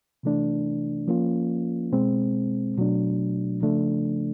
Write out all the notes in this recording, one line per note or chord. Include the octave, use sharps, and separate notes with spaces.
C3 E3 A3 D4
F3 A#3 C#4 F4
B2 G#3 C4
B2 F#3 A3 D4
C#3 F3 A3 D4